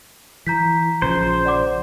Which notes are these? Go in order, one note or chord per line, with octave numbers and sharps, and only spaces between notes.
E3 A#5 G6 B6
A#1 C#3 F3 C5
D5 F#5 D6